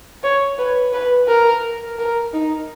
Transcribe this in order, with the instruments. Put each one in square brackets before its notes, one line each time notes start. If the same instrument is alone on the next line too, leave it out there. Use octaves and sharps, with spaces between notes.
[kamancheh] C#5
B4
B4
A#4
A#4
D#4